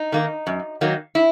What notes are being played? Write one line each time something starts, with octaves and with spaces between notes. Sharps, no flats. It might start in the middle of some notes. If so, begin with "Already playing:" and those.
Already playing: D#4
D#3 A#3
F#2
D#3 F#3 A#3
E4